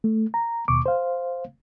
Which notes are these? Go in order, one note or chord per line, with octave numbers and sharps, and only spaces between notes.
A3
A#5
D#2 B2 C#6 D6
C5 F5